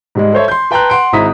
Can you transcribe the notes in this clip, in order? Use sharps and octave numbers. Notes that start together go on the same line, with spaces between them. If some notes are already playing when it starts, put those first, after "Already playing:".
G#2 G3 G#3
A4 C5 C#5 E5
C6 G6
B4 G5 A5 A#5 C6 F#6
F#5 C6 D7
G#1 G#2 E4 A#5 D#6 B6